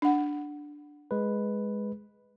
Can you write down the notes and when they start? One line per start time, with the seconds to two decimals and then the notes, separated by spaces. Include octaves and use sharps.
0.02 D4 F#5
1.11 G#3 B4